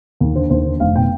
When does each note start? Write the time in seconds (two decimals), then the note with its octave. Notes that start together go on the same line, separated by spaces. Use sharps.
0.21 D#2
0.35 D3 C5
0.50 D#2 C5
0.65 D3
0.80 F1 F5
0.96 B2 G5